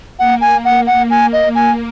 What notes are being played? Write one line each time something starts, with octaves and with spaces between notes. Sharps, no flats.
A#3 F#5
G#5
F#5
F#5
G#5
D#5
G#5